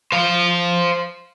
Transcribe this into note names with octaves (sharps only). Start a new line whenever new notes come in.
C5 F5